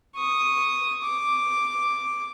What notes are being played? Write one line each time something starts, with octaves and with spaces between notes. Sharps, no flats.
C#6 D#6
D6